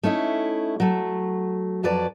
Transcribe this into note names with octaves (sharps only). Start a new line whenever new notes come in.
A3 C#4 D#4 E4
F#3 A3
F2 F#3 B4 D5 A5